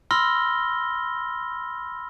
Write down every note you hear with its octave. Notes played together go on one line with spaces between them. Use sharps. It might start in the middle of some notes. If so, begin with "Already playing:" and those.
B5 C6 E6 F6 A#6 G7